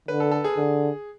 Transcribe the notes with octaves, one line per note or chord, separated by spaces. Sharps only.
D3 B4
A4
A4
G#4
D3